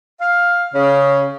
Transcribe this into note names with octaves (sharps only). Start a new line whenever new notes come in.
F5
C#3